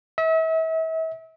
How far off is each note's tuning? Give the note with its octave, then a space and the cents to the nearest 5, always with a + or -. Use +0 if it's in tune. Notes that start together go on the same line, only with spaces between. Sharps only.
E5 -35